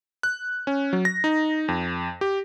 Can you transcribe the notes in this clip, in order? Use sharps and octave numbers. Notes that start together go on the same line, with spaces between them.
F#6
C#4
F#3
A#6
D#4
F2
G4